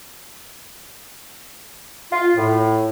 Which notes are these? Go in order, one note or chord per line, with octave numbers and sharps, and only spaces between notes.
F4
A2